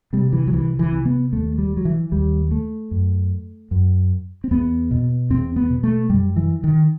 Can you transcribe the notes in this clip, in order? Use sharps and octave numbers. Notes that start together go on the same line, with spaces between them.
C3 G3
E3
F#3
C2 E3
E3
C3
B3
D#2 A3
G3
F#3
E3
D#2 G3
A3
F#2
F#2
C4
E2 B3
B2
E2 C4
B3
B2
A3
F#2 G3
E3
D#3